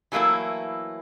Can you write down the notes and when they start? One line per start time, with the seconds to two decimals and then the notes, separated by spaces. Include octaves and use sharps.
0.12 E3 F#3 A3 A#3 E4